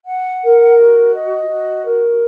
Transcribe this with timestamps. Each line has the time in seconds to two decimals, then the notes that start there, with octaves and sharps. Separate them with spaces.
0.06 F#5
0.41 A#4
0.77 F#4
1.12 D#5
1.48 F#4
1.83 A#4